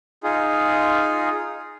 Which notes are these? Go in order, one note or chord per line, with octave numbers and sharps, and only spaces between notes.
D#4 F4 G#4